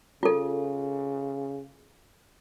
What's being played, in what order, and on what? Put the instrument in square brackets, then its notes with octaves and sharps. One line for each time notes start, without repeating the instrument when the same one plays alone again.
[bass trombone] C#3 [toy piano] F4 A4